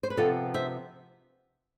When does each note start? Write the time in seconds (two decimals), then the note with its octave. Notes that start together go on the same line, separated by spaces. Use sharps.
0.03 C5
0.10 B4
0.17 C3 F3 B3 F4 A4
0.54 C5 E5